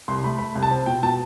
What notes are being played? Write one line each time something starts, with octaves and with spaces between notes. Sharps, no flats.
C2 C6
A3 B5
A3 B5
C2
A5
C4
B2 G5
B2 A5